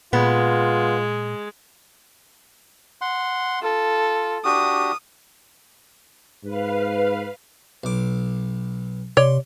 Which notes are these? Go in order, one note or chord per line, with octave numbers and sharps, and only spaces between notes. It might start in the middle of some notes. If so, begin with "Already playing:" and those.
A#2 G#3 B3 F4
F#5 C6
F4 A4
D4 F#4 G4 D#6
G#2 B4 F5
B1 D6
C3 C#5 D5 C6